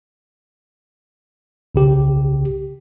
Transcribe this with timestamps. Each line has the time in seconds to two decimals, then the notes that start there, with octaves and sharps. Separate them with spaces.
1.75 C2 C#3 G4